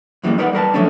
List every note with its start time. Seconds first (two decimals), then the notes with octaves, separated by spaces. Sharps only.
0.23 F#2 E3 G3 G#3 A#3
0.38 D#4 A#4 B4 C#5 D5 F#5
0.53 G3 A#4 B4 A5
0.74 F3 F#3 A3 C#4 D4